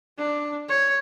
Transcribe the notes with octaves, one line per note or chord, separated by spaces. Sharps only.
D4
C#5